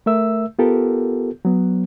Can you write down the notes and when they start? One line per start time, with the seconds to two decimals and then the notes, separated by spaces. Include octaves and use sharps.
0.06 A3 A#4 E5 E6
0.59 B3 F4 G4 A4 A#4
1.45 F#3 B3